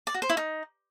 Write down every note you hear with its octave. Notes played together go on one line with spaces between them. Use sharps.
D5
F#4
C5
E4
D#4